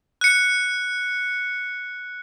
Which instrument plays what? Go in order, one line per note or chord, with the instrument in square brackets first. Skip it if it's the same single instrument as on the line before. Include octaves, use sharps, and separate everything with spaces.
[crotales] F#6 C#7